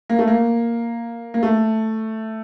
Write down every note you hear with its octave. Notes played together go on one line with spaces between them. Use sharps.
A#3
A3
A#3
A#3
A3